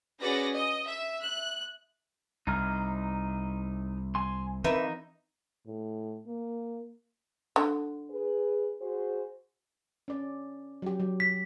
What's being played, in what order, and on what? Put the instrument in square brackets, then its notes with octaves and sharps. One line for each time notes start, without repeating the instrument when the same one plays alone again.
[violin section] C#4 F#4 G#4 B4 D5 A#6
D#5
E5
F#6
[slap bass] C2 [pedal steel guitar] D#4 A#5 F6
[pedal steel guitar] G#5 C6
[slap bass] E3 C4 [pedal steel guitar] D#4 [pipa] A#4 B4 E5
[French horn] A2
A#3
[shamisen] D3
[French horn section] G#4 B4
F#4 G#4 C5
[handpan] C#4 D5
F#3 G4
F#3
[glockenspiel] B6